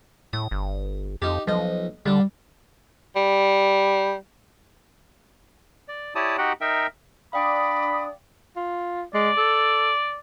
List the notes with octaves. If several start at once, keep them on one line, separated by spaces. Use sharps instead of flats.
A2 D#6
G1
F2 D#4 G4
B1 F3 D#5
D3 G3 D4
G3
D5
E4 G4 C#5 D5 A5 D#6
D#4 F#4 G4 F#5 G5
D#4 A#4 E5 G5
D4 D5 F5 G5 B5 D6 D#6
F4
G#3 D5
A4